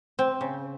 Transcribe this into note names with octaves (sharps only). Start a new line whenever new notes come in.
C4
C#3